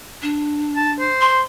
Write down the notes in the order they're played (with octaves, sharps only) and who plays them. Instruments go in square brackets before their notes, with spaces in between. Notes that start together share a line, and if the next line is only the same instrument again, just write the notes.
[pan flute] D4
[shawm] A5
C5
[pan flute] C6